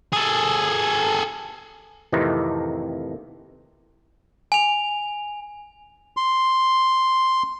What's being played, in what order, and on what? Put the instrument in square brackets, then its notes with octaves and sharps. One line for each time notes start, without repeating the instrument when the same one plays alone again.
[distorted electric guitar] G#4 A4
[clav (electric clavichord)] F2 A2 C3 D#3 E3 D#4
[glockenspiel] G#5 F7
[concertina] C6